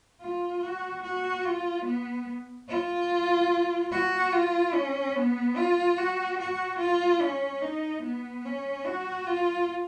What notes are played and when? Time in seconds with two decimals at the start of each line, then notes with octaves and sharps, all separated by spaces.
0.21 F4
0.63 F#4
1.03 F#4
1.45 F4
1.85 B3
2.69 F4
3.92 F#4
4.33 F4
4.74 C#4
5.16 B3
5.57 F4
5.98 F#4
6.39 F#4
6.79 F4
7.21 C#4
7.62 D#4
8.03 B3
8.45 C#4
8.86 F#4
9.27 F4